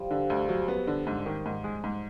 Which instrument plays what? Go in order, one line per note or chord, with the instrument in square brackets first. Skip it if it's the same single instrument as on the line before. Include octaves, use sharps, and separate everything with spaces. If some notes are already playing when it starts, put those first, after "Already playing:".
Already playing: [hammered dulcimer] F3 G3
[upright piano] D3
D2
F#3
B3
D3
G#2
D#3
G#2
G#3
G#2